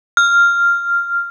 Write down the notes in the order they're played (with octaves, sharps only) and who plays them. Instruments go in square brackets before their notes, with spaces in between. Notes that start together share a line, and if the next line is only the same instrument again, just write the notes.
[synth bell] F6